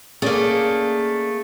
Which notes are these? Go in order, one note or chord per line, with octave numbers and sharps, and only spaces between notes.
A3 A#3 C#4 G#4 D5